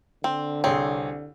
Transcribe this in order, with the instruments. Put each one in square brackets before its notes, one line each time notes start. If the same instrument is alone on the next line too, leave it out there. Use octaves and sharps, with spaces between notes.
[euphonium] D3 [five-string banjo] C4
[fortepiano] C2 G#4 C#5 [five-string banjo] C4